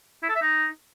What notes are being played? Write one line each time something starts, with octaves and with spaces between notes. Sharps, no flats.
E4
A4
E5
D#4